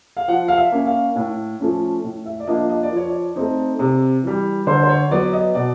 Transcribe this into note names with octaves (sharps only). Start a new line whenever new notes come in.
F5
F3 F#5
F5
E5
A#3 C#4
F5
A2
F3 A3 C#4
A2
E5
D5
F3 A#3 D4 D#5
D#5
D5
F3 C#5
D5
A3 C4 D#4
C3
E3 G3
D3 C5
C5
C#5
F#3 B3 D5
D#5
B2 D5